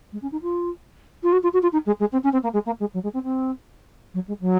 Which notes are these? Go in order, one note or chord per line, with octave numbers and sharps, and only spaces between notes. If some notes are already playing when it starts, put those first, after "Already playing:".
G#3
C#4
D#4
F4
F4
F#4
F4
F#4
F4
D#4
G#3
G#3
C4
C#4
C4
A#3
G#3
A#3
G#3
F#3
G#3
C4
C4
F#3
G#3
F#3